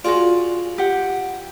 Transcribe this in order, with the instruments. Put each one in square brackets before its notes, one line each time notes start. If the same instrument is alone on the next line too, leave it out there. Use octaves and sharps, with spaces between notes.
[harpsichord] F4 [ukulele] F#4 G#4 D5
[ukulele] G4 F#5